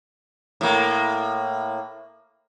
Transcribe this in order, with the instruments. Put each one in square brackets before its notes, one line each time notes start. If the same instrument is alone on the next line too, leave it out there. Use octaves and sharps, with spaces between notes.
[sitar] A2 A#3